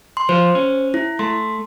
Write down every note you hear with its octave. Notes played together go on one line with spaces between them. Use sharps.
C6
F3 C5
C#4
E4
A3 C6